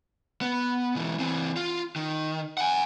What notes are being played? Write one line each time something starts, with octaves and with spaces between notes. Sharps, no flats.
B3
B1 E3
E3 C4
F4
D#3
F#5 G#5